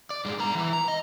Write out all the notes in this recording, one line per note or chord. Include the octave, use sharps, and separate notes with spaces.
D5
G2 G#3
B3 A#5
E3 B4
A#5
D#5